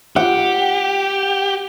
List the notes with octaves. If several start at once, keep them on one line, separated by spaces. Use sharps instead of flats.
G4 F#5